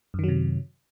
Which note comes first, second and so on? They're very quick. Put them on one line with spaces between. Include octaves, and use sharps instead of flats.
F#2 D#3 F#3 C3